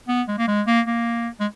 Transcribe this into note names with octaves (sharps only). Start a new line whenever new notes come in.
B3
G#3
A#3
G#3
A#3
A#3
G#3